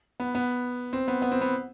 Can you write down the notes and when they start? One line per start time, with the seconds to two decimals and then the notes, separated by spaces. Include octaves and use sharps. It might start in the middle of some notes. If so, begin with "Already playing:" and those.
0.20 B3
0.35 B3
0.93 C4
1.08 B3
1.22 B3
1.32 C4
1.41 B3